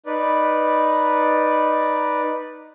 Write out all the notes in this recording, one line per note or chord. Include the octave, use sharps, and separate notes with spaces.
D#4 B4 D5